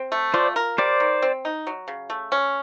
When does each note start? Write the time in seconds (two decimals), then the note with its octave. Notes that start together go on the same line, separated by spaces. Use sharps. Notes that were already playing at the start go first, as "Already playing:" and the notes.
Already playing: C4
0.12 A3
0.34 F4 C5 D5
0.56 A#4
0.78 G3 C5 D5
1.00 D#3
1.22 C4
1.45 D#4
1.67 F#3
1.88 C#3
2.10 A3
2.32 C#4